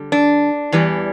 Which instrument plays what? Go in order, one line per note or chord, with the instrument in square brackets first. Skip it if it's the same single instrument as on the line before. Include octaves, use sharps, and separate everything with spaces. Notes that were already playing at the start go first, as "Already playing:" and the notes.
Already playing: [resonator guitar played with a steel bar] D3 G3
D4
E2 E3 G3